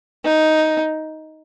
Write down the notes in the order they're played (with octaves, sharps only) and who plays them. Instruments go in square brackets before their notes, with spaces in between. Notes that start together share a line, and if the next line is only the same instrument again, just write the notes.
[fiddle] D#4